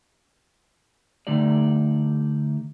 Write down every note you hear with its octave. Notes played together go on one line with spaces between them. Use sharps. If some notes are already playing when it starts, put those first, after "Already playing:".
D3 A3 D#4 G4 D5